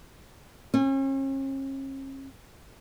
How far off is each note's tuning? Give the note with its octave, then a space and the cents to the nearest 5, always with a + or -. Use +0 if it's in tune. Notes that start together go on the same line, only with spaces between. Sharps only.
C#4 -40